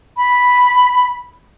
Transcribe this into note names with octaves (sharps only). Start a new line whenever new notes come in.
B5